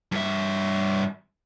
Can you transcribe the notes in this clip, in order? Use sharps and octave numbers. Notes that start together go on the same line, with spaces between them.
G2 E5